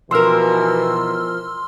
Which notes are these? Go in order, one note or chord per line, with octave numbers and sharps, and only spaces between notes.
B2 E3 F3 A#4 C6 E6 F6